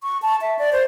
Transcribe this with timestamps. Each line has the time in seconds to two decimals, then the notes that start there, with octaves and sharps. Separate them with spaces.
0.03 C#6
0.22 A5
0.41 E5
0.59 D5
0.73 C5